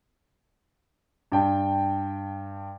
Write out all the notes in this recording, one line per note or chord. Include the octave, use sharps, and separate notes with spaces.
G2 G5 A5